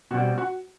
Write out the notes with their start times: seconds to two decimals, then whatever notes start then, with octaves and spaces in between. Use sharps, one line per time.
0.11 B2 G3 C4 F#4
0.38 F#4